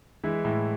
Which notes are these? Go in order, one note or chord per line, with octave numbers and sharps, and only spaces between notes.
E3 G#3 E4
A2